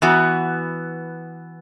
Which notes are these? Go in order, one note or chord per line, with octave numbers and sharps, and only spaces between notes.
E3 B3 F#4